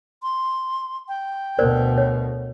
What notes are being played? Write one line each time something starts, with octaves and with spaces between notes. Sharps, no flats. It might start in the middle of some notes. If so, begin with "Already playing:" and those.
C6
G5
D2 B2 A#4 C5 D5
C#5